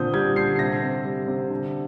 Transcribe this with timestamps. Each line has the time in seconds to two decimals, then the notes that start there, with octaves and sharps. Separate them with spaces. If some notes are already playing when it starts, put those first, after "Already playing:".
Already playing: A#2 D3 C4 D#6 G6
0.14 G3 G#6
0.36 D3 C7
0.56 C7
0.59 C3 A#6
0.82 C4
1.05 G3
1.28 C3
1.50 D3